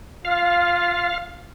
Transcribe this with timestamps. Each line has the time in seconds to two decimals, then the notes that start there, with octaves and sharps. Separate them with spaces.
0.25 F4 F5